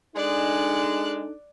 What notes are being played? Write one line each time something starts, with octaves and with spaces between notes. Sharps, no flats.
G#3 D4 D#4 A4 D5 F#6